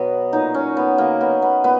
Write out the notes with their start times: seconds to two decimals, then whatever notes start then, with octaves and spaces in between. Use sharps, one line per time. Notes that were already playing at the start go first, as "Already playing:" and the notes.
Already playing: B2 F#3 B3
0.32 A#2 F#3 D#4
0.55 C#4
0.77 B3
0.98 C#3 F#3 A#3
1.21 B3
1.42 B3
1.64 A#2 B3